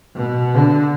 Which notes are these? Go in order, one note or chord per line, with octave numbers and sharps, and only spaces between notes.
B2
D3